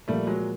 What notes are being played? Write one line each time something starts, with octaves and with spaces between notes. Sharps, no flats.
A#2 F3 G3 A3 A#3
F#3 G#3